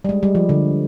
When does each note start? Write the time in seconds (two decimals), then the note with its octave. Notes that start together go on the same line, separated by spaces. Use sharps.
0.05 G3
0.09 G#3
0.23 G3
0.35 F3
0.49 D3